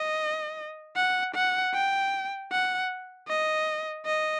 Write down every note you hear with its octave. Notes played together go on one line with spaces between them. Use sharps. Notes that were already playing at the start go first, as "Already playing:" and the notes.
Already playing: D#5
F#5
F#5
G5
F#5
D#5
D#5